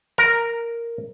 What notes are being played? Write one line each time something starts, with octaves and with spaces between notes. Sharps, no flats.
A#4